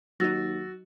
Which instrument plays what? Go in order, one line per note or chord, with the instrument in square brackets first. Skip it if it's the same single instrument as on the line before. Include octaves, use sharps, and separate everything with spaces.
[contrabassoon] D#2 [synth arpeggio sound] F#3 D#4 [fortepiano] F#4 [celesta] E6 A6 A#6